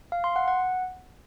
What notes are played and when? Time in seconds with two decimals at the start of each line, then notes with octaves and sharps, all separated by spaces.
0.12 F5
0.24 C6
0.36 F#5
0.48 F#5